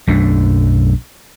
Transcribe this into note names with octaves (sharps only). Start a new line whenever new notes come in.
B1 F#2 A3 D4